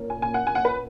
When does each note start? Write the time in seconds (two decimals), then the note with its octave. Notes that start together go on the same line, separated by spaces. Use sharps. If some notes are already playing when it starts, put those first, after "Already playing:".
Already playing: A#2 A#3 C#4
0.10 G#5
0.22 G#5
0.34 F#5
0.47 G#5
0.55 F#5
0.65 B4